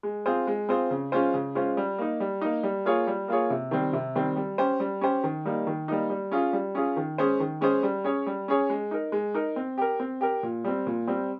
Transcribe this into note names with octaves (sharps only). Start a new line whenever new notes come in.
G#3
C4 F4 G#4 C5
G#3
C4 F4 G#4 C5
C#3
G#3 C#4 F4 C5
C#3
G#3 C#4 F4 C5
G3
A#3 D#4
G3
A#3 D#4
G3
A#3 F4 G#4 C#5
G3
A#3 F4 G#4 C#5
C3
D#3 G3 C4
C3
D#3 G3 C4
G3
C#4 G4 C5
G3
C#4 G4 C5
D#3
G3 A#3 D#4
D#3
G3 A#3 D#4
G3
C#4 F4 G#4
G3
C#4 F4 G#4
D#3
G#3 C#4 G#4 C5
D#3
G#3 C#4 G#4 C5
G3
C#4 G#4 C#5
G3
C#4 G#4 C#5
G#3
D#4 A#4
G#3
D#4 A#4
C4
G4 A#4
C4
G4 A#4
A#2
G3 C4
A#2
G3 C4